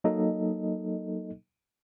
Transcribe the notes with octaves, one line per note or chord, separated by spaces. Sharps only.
F#3 A#3 D#4 A4 D#5